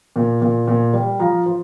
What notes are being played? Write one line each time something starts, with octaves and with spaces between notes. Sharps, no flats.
A#2
A#2
A#2
G3
F3 F5 A#5
F3 C5